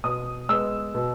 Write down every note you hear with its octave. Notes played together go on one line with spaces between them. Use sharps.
B2 D#6
G#3 B3 E6
B2